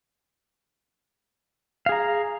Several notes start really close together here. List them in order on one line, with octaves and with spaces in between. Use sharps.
F5 G#4 A#5